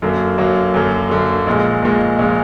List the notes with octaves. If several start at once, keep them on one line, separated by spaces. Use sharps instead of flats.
F#2 D3 F#3 A#3
F#2 D3 F#3 A#3
F#2 D3 F#3 A#3
F#2 D3 F#3 A#3
A#1 A#2 G#3
A#1 A#2 G#3
A#1 A#2 G#3